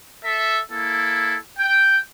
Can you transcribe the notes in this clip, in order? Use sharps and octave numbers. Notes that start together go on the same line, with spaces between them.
A4 E5
A#3 E4 A4
G5